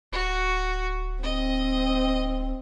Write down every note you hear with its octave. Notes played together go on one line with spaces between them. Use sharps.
D1 F#4
C4 D#5